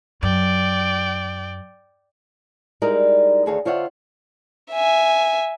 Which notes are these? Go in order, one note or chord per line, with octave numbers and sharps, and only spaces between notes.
F#2 D5 G5
G3 G#3 D#4 E4 A#4 D#5
D2 D#3 G#4 A4 C#5 F5
D3 F4 C5 C#5 E5 F#5
E5 G#5